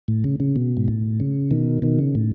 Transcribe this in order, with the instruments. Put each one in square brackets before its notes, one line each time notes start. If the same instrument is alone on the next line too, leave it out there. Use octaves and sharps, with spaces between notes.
[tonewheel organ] A2
C#3
C#3
B2
G#2
A2
C#3
B2 D#3
B2 D#3
C#3
A2